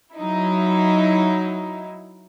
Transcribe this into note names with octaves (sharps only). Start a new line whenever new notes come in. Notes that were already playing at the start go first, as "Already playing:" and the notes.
F#3 D#4 E4